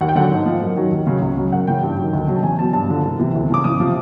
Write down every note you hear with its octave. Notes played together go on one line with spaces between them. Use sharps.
D#2 F#5
G5
D3 F#3 F#5
G#2
F3
F#2
D#3 F#3
D#2
C#3 F#3
C#2
C#3 F#3
F#2 F#5
C#3 E3 G5
G2
D#3 F#3
D2
C#3 F#3
A5
E2 G#5
B2 F#3 A5
G2 A5
D3 F3
C2
C3 E3
D2
C#3 E3 D6
F2 D#6
C3 F3